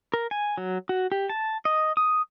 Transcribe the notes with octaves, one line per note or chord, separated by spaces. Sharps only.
A#4
G#5
F#3
F#4
G4
A5
D#5
D#6